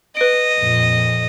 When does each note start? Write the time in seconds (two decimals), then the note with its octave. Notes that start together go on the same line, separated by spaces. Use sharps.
0.17 B4 D#5 D7
0.58 F2 A#2